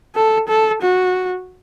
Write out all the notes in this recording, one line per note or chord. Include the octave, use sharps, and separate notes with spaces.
A4
A4
F#4